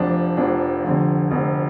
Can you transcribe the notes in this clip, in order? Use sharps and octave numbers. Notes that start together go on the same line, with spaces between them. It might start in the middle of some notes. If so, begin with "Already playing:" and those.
Already playing: F1 F2 F3 D4
F1 F2 F3 D4
F1 F2 D3
F1 F2 D3